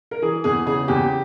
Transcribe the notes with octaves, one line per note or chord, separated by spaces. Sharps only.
A#4
E3 G#4
E2 G#4
C#3 G#4
E2 G4